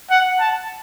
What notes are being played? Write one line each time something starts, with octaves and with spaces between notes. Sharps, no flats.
F#5
A5